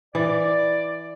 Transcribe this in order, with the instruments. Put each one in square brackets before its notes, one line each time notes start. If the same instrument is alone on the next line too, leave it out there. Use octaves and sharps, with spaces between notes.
[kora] E3 [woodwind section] D5